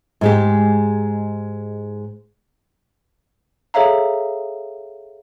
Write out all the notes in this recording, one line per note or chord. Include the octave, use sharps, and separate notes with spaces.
G#2 G#3 G4
G#4 A4 C#5 E5 F5 A#5